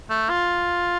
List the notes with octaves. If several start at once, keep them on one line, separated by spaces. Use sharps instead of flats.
A3
F4